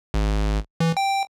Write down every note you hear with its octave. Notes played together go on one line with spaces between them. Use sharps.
G#1
E3
G5